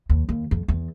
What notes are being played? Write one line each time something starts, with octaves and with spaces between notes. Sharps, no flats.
D#2
D#2
F2
E2